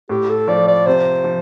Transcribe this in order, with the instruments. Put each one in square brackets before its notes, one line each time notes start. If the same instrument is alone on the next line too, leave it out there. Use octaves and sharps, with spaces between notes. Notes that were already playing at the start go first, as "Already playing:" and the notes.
[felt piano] A2 [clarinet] G4
[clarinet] A4
[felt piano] F3 [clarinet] D5
[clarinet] D5
[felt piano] C3 [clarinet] C5
[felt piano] F3